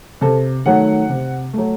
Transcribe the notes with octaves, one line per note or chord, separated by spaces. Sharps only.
C3 A4
D#3 F#3 A3 F#5
C3
F#3 A3